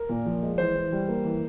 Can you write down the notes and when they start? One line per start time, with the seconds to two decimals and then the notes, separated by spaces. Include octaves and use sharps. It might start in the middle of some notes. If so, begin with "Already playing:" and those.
Already playing: A#4
0.09 A#2
0.26 F3
0.43 G#3
0.58 E3 C5
0.75 E3
0.92 G3
1.09 A#3
1.24 E3